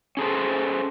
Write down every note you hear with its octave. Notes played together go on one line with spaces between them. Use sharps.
C#4 G#4 A4 C5